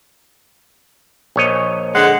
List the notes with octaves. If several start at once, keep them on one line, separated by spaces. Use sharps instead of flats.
A#1 C#5 D#5
D3 G#3 F#5